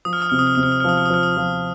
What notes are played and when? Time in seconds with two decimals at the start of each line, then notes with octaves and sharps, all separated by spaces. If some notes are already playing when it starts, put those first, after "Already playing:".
0.05 F3 D#6
0.13 F6
0.22 D#6
0.30 C3 F6
0.39 D#6
0.47 F6
0.55 C3 D#6
0.63 F6
0.72 D#6
0.80 F6
0.84 F3 D#6
0.97 F6
1.06 D#6
1.10 F3 F6
1.23 D#6
1.37 F3